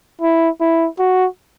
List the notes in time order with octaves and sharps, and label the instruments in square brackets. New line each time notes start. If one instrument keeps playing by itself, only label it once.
[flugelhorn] E4
E4
F#4